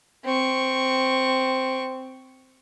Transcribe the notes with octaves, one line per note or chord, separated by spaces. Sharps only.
C4 C#6